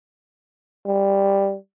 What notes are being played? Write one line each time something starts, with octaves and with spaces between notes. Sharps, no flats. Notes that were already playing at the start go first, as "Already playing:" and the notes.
G3